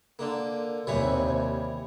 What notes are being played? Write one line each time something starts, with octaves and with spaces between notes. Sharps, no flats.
D3 A#3
D#2 C3 E3 G3 C#5